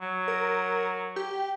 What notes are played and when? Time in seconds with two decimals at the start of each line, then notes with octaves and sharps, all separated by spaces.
0.02 F#3
0.28 A#4
1.16 G4